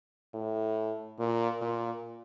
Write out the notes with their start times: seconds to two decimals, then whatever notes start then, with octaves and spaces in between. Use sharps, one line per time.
0.34 A2
1.19 A#2
1.61 A#2